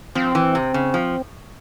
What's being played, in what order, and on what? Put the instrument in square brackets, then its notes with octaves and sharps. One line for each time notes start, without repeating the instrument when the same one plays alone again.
[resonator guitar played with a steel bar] F3 [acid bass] C4
[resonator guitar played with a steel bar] E3
C3
C#3
F3